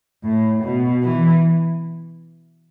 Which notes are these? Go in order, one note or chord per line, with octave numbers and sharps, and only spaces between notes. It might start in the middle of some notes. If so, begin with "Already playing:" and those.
A2
B2
E3